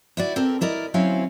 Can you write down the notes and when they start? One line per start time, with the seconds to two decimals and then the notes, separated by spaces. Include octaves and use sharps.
0.17 E4 F#4 D5
0.36 C4 G4 A4 A#4
0.61 E4 A#4 D5 D#5
0.94 D2 F#3 C4 C#4 E4 F5